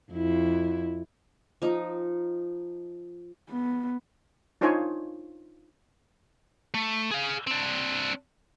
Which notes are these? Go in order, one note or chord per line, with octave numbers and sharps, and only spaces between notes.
F2 E4
F3 D#4
B3
D4 D#4 F4 C5 C#5 G#5
A3
G#4 F5
C4 D4